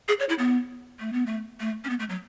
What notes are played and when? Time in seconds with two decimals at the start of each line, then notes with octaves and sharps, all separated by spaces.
0.08 G#4
0.20 C#5
0.29 E4
0.39 B3
1.00 A3
1.13 B3
1.26 A3
1.60 A3
1.84 C#4
1.89 B3
1.99 A3
2.09 F#3